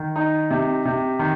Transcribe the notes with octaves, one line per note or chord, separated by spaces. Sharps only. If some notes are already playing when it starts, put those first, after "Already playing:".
Already playing: D#3
D#4
C3
C3
D#3